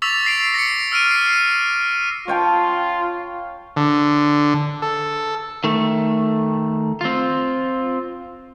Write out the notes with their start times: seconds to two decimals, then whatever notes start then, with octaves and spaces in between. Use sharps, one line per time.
0.02 C#6 D6 E6 A6 B6 F7
0.25 A#6 C7 D7 F7
0.54 A#6 C#7
0.92 E6 F6 D7 D#7
1.11 C7
1.32 D#7
2.28 F4 C#5 G5 A5
3.76 D3
4.82 A4
5.64 D#3 A3
7.01 C4 F4